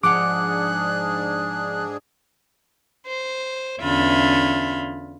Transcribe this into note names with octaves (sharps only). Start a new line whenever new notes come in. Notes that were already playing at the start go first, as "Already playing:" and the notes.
G#2 F3 D4 G#4 F#5 D6 F#6
C5
E2 D3 C#4 F4 E5 B5